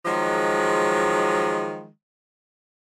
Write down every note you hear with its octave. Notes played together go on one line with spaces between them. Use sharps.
D#3 F3 F#3 G#3